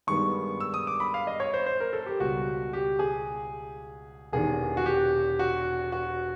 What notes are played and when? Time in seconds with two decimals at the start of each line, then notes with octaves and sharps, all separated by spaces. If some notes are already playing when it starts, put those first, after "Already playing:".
0.07 G2 D#3 G#3 B3 C#6
0.60 E6
0.74 D#6
0.87 D6
1.00 B5
1.14 F5
1.27 D#5
1.40 C#5
1.54 C5
1.66 C5
1.80 A#4
1.93 A4
2.06 G4
2.20 C#2 B2 G3 F#4
2.73 G4
2.99 G#4
4.33 E1 E2 C3 D#3 G#4
4.77 F#4
4.86 G4
5.39 F#4
5.92 F#4